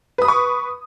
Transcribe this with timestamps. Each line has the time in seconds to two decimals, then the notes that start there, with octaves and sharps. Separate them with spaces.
0.18 B4
0.22 D#6
0.25 B5
0.28 C#6